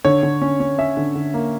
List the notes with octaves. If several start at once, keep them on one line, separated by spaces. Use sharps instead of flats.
D3 C#5
D3
C#4
C#4
C#4 E5
D3
D3
A#3